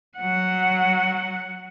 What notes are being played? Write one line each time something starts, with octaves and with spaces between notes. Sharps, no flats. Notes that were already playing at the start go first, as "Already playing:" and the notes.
F#3 F#5